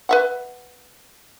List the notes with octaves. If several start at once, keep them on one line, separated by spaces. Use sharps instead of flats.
B4 E5 F#5